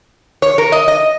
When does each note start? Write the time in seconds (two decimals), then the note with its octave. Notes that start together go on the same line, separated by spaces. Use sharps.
0.42 C#5
0.58 A#4
0.72 D#5
0.88 D#5